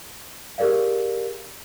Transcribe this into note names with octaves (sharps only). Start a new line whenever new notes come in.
G4 G#4 A#4 D5 F5